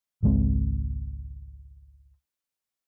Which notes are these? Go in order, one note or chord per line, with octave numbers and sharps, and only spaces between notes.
G#1 C#2 G#3 C4